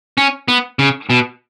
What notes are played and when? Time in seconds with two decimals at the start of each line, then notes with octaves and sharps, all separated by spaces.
0.18 C#4
0.48 B3
0.79 C#3
1.10 B2